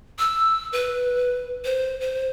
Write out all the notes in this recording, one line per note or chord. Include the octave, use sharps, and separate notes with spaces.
E6
B4
C5
C5